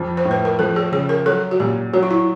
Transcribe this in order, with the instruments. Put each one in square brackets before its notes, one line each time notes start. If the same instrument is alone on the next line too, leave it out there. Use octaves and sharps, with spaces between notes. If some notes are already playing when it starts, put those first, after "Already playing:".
Already playing: [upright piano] F2 F3
[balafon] C5
[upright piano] A2
[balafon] B4
A#4
[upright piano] F3 [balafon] A4
[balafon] G#4
[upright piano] C#3 [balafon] G#4
[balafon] A#4
[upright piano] F#3 [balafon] A4
[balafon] F#4
[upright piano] A#2 [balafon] G4
[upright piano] F#3 [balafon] F#4
[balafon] F4
E4